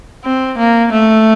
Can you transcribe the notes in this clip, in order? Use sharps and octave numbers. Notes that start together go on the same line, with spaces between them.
C4
A#3
A3